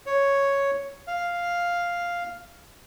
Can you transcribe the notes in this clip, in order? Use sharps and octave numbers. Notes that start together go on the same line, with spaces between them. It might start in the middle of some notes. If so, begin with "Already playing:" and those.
C#5
F5